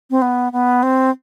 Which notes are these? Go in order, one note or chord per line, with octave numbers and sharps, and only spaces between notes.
C4
B3
B3
C4